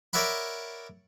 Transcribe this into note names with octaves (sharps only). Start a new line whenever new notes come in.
A#4 C#5 D5 E5 F#5 B5